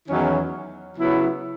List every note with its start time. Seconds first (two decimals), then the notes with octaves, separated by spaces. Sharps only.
0.08 E2 D#3 F#3 C#4 E4
0.96 C#3 F#3 B3 E4